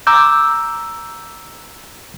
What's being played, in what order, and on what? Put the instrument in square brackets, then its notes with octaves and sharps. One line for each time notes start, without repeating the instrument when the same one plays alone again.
[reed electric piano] A#5 D6 E6 G6